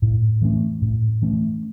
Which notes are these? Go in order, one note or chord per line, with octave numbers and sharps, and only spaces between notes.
A2
E3 A3 C#4
A2
E3 A3 C#4